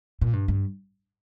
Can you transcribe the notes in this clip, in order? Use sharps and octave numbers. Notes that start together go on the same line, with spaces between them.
A#2
G2
G2